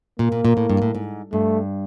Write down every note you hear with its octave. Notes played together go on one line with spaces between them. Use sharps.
A#2 A#3
A#2
A#2
A2
G2
A2
G#2
G2 A3